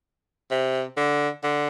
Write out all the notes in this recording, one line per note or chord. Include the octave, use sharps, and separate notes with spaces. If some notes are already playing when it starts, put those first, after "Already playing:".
C3
D3
D3